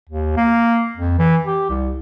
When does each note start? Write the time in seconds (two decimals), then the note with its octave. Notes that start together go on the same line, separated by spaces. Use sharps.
0.10 D#2
0.37 A#3
0.97 F2
1.19 E3
1.46 G4
1.70 C2